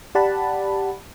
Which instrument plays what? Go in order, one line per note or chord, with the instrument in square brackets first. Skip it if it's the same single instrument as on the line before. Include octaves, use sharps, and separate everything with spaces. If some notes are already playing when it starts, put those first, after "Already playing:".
[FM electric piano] G4 D5 F#5 A5 B5